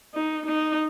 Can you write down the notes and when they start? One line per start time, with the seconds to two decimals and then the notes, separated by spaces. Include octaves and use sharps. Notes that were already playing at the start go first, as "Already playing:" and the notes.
0.14 D#4
0.46 D#4